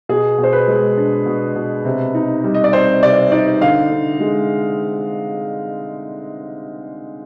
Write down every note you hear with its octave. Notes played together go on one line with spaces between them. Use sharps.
B2 G#4
B2
C5
B4
G#3
D4
B2
B2
C3
D#4
G3
D#5
D5
C4 C5
C3 D5
D#4 D5
D3 F5
D3
G#3